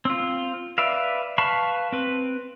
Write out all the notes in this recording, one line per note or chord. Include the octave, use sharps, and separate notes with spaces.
C4 F4
B4 D5 E5 F5
B4 F5 A5 B5 C#6
C4 B4